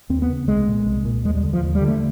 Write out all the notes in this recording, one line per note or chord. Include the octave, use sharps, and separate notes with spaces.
D#2 C4
B3
C#3
C2 G#3
A#2
C2
A#2
D#2 G#3
G3
D3
F3
D#2
G3
D3
A3